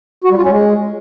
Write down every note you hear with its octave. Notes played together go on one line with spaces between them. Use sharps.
F#4
G3
F4
C#4
G#3